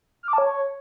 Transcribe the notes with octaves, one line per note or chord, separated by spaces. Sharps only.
F6
D6
A5
C#5